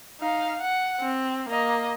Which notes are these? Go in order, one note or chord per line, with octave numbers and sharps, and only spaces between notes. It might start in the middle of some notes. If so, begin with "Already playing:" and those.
D#4 F5
F#5
C4
A#3 D#5